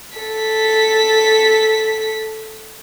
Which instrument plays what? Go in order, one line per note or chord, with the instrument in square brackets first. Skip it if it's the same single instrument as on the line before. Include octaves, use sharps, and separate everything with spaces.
[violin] A4 B6